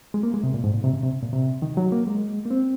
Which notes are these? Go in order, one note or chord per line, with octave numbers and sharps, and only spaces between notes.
G#3
A#3
G#3
C3
A#2
G#2
A#2
C3
C#3
C3
A#2
C3
D#3
F#3
A#3
G#3
A#3
C4